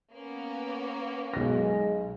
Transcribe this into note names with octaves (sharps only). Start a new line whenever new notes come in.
A#3 B3 C#4
B1 G#3 A#6